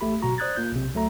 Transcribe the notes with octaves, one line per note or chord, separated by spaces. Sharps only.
A1 A3 G4 B5
G1 B2 F#3 F#4 A#5 C#6
C5 D5 D#6 F#6 G#6 A6
A#3 F4 G6
B1 C3
C#2 F#3 A3 A#5